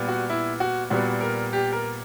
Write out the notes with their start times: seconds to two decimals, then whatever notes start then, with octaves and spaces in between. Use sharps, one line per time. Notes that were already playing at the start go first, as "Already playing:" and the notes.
Already playing: A#2 G3 B3
0.08 F#4
0.30 E4
0.60 F#4
0.90 A#2 G3 B3 F#4
1.21 A#4
1.53 G4
1.72 A#4